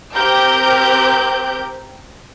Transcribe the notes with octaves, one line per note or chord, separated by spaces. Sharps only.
C4 G4 A#4 G6